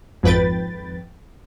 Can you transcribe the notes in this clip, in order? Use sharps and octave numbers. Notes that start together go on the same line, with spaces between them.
G#1 F2 B4 G5 A6